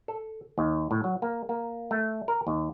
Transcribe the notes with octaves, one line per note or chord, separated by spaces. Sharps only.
A4
D#2
A2
F#3
A#3
A#3
A3
A#4
D#2